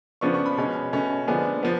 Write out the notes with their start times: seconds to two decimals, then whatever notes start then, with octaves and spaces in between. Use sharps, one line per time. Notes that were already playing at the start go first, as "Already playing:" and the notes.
0.21 C#3 F3 B3 D4 C#6
0.34 C#6
0.46 B5
0.58 B2 G#3 C#4
0.92 B2 A3 C#4
1.27 D3 F3 G#3 B3 D4 G#5
1.63 F3 B3